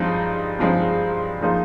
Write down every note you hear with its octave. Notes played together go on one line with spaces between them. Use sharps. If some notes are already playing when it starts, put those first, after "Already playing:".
Already playing: G2 F3 G#3 C4 D#4
G2 F3 G#3 C4 D#4
F3 A#3 D#4 G#4 C5